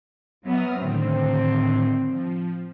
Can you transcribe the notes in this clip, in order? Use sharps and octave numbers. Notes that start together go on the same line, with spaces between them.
F#3 B3 E5 D#6 F6
A2 D3 D#3 C4
F3